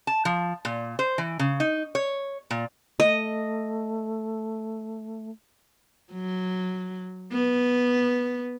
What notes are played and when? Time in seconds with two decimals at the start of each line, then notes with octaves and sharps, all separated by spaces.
0.07 A5
0.25 F3
0.65 A#2
0.99 C5
1.18 E3
1.39 C#3
1.60 D#4
1.95 C#5
2.51 A#2
3.00 A3 D#5
6.12 F#3
7.32 B3